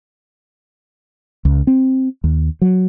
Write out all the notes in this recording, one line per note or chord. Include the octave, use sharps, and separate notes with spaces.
C#2
C4
D#2
F#3